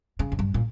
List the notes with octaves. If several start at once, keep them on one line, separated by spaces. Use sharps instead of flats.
C#3
F2
G2
A#2